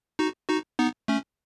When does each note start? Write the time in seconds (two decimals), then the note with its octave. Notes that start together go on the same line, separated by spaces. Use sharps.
0.19 D#4 F#4
0.49 D#4 F#4
0.79 B3 D#4
1.08 A3 C#4